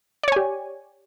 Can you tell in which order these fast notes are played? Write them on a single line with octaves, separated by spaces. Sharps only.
D5 C#5 G#5 G4